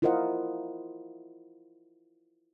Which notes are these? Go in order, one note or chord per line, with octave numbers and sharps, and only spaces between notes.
E4 F4 A#4 C5 D#5 F#5